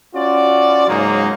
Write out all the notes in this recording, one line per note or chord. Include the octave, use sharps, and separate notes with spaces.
C#4 F4 F#4 D5
G#2 C#3 F#3 G#3 A#3 D#4